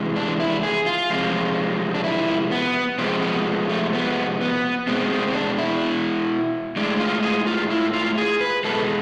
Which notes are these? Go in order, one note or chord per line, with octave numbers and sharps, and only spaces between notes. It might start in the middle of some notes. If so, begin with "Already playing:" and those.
Already playing: C3 E3 G#3
D4
E4
G#4
F4
C3 F3 G#3
D4
E4
B3
C3 F3 G#3 C4
B3
A3
B3
B3
B2 G#3 C4
C4
C4
D4
E4
A2 G#3 D4
F4
G#4
F4
E4
F4
G#4
B4
B2 G#3 A4